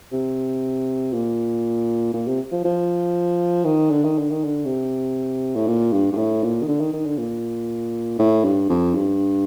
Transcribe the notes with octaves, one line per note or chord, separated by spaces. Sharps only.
C3
A#2
A#2
C3
F3
F3
D#3
D3
D#3
D3
D#3
D3
C3
A2
A#2
G2
G2
A2
A#2
D#3
D3
D#3
D#3
D3
A#2
A2
G2
F2
G2